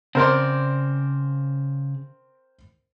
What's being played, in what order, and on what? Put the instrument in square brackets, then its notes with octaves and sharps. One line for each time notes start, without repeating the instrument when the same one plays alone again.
[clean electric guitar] C#3 D5 [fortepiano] C4 A#4 C5